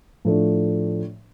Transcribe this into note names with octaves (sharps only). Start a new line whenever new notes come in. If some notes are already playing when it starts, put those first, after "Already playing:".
A2 F3 A3 D4